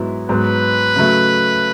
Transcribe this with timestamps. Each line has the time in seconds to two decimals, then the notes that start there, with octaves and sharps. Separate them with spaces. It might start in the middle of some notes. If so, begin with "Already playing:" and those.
Already playing: G#2 F#3 B3 E4
0.28 G#2 F#3 B3 B4
0.96 C#3 F#3 A3